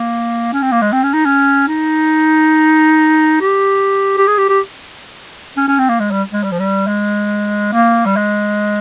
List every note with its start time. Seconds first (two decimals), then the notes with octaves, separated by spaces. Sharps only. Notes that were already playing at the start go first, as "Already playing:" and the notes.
Already playing: A#3
0.53 C#4
0.62 C4
0.72 A#3
0.81 G#3
0.92 C4
1.03 C#4
1.13 D#4
1.25 C#4
1.68 D#4
3.41 G4
4.17 G4
4.27 G#4
4.37 G4
4.49 G4
5.57 C#4
5.68 C#4
5.78 C4
5.89 A#3
6.00 G#3
6.11 G3
6.32 G#3
6.43 G3
6.51 F3
6.59 G3
6.87 G#3
7.72 A#3
8.05 G3
8.16 G#3